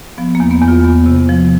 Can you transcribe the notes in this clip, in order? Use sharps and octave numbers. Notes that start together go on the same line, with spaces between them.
F3 B3
A#3
E2
B3
E2
F4
E2 B3
C3
F3